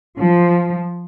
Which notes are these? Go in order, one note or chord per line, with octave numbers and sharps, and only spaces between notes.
F3